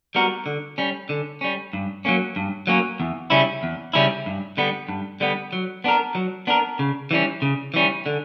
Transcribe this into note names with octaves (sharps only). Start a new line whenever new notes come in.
G3 B3 F#4 A#4
D3
G3 C#4
D3
G3 C#4
G2
F#3 A#3 C#4
G2
F#3 A#3 C#4
E2
C#3 G3 C#4 E4
E2
C#3 G3 C#4 E4
G2
D3 G3 B3
G2
D3 G3 B3
F#3
B3 D4 A#4
F#3
B3 D4 A#4
C#3
E3 G3 C#4
C#3
E3 G3 C#4
D3